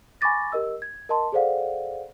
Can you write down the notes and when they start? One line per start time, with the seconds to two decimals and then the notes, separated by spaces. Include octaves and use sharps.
0.21 G#5 B5 C#6 D6 A6 A#6
0.52 G4 A#4 D#5 E6
0.82 G#6
1.09 A#4 D#5 A5 C6
1.32 G#4 A4 C5 D5 F5 F#5